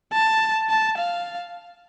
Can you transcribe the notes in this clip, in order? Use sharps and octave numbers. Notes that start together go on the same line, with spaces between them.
A5
A5
F5